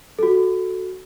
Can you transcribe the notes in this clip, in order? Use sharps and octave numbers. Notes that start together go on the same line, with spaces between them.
F#4 A4